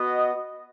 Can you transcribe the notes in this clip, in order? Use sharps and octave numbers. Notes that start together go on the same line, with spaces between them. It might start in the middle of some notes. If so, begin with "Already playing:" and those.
Already playing: B3 F#4 D#5